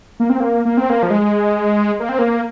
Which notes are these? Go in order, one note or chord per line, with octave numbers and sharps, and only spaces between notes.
A#3
C4
A#3
A#3
C4
A#3
F3
G#3
A#3
C4
A#3